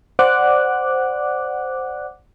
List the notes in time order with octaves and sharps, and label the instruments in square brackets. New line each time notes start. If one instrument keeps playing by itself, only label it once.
[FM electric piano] C5 D5 F#5 D6 F#6